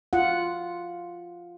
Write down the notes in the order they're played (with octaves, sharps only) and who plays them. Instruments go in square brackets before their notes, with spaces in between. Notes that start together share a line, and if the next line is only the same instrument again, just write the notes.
[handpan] F4 F#5